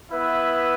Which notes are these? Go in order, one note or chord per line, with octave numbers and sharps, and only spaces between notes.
B3 E4 B4 E5